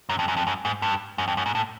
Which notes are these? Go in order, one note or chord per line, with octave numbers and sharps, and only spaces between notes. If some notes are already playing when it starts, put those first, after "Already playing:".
F#2
F2
F#2
F2
F#2
G#2
G2
F#2
F2
F#2
G#2
A2